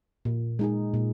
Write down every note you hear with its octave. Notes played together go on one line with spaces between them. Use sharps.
A#2
G#3 D#4 G#4
A#2